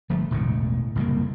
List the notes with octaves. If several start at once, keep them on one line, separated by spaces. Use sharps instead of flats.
G1 F3 A3
E1 A1 A2 D3
F#1 C2 F2 A#3